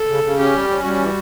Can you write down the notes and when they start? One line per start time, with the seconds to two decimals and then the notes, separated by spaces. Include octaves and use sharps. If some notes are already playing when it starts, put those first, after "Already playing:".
Already playing: A4
0.09 C#3
0.24 C#3
0.39 C#4 G4
0.54 G3
0.69 C#4
0.84 G3 F#4
1.00 E3